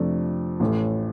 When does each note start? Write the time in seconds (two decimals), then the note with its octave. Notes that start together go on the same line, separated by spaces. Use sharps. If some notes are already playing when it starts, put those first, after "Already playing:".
Already playing: F2 C3 F3 A3 D4
0.60 A1 A2 A3